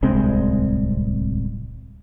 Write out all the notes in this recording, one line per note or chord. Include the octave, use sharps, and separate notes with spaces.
D1 C2 G#3 C4